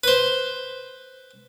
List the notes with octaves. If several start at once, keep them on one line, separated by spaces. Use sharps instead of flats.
B4 C5